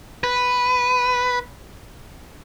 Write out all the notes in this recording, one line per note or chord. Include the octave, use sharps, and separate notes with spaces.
B4